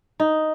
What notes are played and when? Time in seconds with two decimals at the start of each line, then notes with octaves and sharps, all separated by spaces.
0.20 D#4